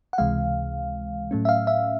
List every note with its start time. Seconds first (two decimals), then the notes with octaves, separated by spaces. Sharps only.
0.13 F#5
0.18 C#2 C3 E3 G#3 F5
1.31 A2 F#3 A3 C#4
1.45 E5
1.49 F5
1.67 E5